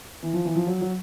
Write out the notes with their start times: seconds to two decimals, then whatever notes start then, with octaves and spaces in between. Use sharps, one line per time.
0.23 E3
0.34 F3
0.45 E3
0.56 F3
0.67 F#3
0.81 F#3